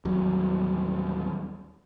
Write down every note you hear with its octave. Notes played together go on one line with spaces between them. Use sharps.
A1 D#2 F#3 G3